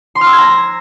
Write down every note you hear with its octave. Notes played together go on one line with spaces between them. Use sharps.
C6
F6
E6
G#6
A#5